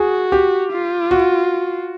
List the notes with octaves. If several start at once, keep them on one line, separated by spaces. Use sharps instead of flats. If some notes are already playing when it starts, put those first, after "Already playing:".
Already playing: F#4 G#4
G4
F4
F#4